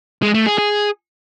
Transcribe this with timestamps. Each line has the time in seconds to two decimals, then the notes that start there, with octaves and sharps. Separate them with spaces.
0.22 G#3
0.34 A3
0.46 G#4
0.58 G#4